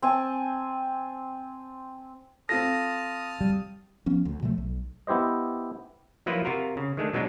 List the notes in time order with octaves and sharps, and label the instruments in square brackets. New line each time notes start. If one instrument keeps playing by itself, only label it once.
[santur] C4 G#5 A5
[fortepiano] C4 F4 A4 [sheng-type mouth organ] A5 D#6 F6 [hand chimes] A#6
[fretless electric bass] G3
F3 B3 C#4
D2
B2 F3 G#3 A3
B1
[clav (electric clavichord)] B3 E4 G4 C5 D#5
F3 F#3 A#3 E4 F4 B4
C3 F4 F#4 A#4
C#3
D#3 G#3 A3 D4
B2 F#3 G#3 D4 D#4